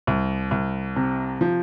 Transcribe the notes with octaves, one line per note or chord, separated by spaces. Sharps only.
C2
C2
C3
F3